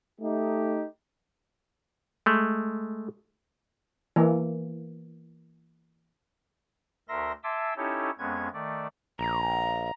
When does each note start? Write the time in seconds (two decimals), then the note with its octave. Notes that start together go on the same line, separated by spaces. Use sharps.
0.21 A3 D#4 G4
2.26 G#3 A3
4.16 E3 A#3
7.08 D2 A#4 E5 C6 A#6
7.43 E5 G#5 A5 C6 D6 E6
7.77 C#4 D#4 E4 G4 A4 C#5
8.18 F2 G#3 B3 C#4 G#6
8.53 D#3 A3 D5
9.19 A#1 A#5